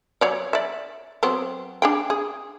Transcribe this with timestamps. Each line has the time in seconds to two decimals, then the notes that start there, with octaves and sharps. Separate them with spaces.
0.21 F#3 C#5 D5
0.53 D5 E5
1.23 F#3 B3 C4
1.82 D4 G#4 G5
2.10 G#4